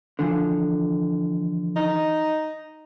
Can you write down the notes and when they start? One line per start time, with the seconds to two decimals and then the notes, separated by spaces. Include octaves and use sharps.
0.19 D3 E3 F3
1.76 D#4